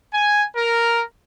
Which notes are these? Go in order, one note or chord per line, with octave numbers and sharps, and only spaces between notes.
G#5
A#4